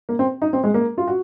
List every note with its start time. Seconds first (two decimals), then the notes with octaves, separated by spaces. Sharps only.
0.09 A#3
0.19 C4
0.42 D#4
0.53 C4
0.64 G#3
0.74 A#3
0.98 F4
1.08 F#4